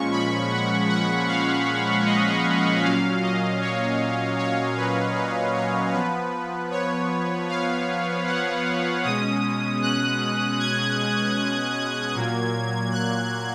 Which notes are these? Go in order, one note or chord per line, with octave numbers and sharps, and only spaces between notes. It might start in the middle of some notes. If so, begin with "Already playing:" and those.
Already playing: A#2 F3 G#3 C#4 C#6
B5
F#5
F#5
F5
D#5
A#2 F#3 C#4 F5
D#5
C#5
C#5
B4
B4
C#5
F3 B3 B4
C#5
F5
F#5
B2 G#3 C#4 D#6
F#6
G#6
A#2 F#3 A#3
F#6